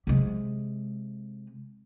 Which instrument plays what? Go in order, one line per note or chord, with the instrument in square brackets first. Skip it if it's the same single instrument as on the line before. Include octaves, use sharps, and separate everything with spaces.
[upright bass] C3 G#3